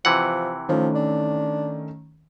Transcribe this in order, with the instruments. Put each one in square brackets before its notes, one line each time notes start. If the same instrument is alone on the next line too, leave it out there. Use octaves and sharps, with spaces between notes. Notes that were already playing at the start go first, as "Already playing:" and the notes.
[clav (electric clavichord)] C3 E3 F#5 [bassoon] F3
[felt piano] D#3 A3 C#4 [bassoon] F3
[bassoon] D4